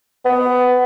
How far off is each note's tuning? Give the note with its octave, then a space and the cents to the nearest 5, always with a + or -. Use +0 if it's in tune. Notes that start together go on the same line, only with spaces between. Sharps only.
B3 +15